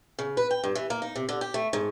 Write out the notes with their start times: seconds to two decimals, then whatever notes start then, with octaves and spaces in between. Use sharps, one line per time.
0.19 C#3
0.37 B4
0.51 G5
0.64 G2
0.75 E3
0.90 A#3
1.02 D#4
1.16 C3
1.29 D3
1.41 G4
1.54 A3
1.73 G#2